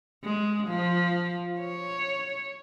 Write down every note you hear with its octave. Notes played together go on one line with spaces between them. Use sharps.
G#3
F3
C#5